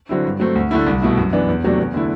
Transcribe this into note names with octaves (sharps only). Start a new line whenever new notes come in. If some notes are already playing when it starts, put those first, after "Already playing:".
D3 F#3 C4 E4
G2
F#3 A3 C4
D2
D3 A3 E4
C2
B2 A3 E4
F#2
E3 B3 D4
E2
C3 F#3 A3 D4
E2
D3 A3 E4